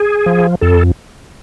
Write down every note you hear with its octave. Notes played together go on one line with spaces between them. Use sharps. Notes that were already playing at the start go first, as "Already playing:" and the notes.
Already playing: G#4
F3
F2 A4